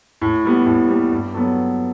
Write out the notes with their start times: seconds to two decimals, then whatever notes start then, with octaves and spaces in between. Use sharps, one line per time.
0.22 A2
0.45 G3 B3
0.66 A2
0.89 G3 B3
1.12 G2
1.34 F#3 B3 F#4 A4